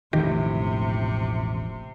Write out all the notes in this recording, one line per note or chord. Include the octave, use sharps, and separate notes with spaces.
E1 A1 A2 C3 D#3 F3 G4